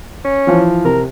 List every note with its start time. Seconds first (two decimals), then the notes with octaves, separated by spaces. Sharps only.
0.24 C#4
0.47 E3 F3
0.85 C3 A#4